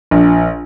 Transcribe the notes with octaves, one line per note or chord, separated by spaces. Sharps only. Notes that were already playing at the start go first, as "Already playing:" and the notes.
A#1